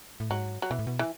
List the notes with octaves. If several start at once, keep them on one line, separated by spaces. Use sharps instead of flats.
A2
G#2 F#3
F#3
B2 E3
A2
B2
E3